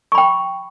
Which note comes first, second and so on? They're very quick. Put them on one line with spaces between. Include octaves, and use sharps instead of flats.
C#6 B5 G5